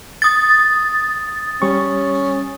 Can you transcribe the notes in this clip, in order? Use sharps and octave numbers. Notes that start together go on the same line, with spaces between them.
D#6 A6
G3 C#4 C#6